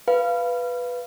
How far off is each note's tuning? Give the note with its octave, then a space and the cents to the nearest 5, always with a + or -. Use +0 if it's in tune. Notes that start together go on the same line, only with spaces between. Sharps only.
B4 +0 F5 -15